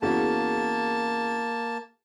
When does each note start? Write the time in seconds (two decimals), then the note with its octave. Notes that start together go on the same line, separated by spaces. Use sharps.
0.02 E2 C#3 A#3 F#4 A5